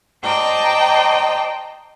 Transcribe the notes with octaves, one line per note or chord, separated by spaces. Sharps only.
C5 D5 D#5 G5 A5 A#5